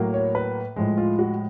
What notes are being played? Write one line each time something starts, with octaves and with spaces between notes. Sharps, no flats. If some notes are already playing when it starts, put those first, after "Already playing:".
Already playing: A2 F#3 A#3
C#5
B4
A2 F3 G#3
F4
F#4